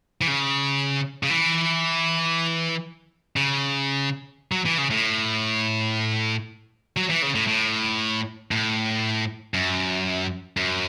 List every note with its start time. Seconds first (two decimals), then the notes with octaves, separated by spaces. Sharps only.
0.21 E3
0.27 C#3
1.23 C#3
1.30 E3
3.36 C#3
4.52 F#3
4.65 E3
4.78 C#3
4.91 A2
6.97 F#3
7.10 E3
7.22 C#3
7.35 A2
7.48 A2
8.51 A2
9.54 F#2
10.57 F#2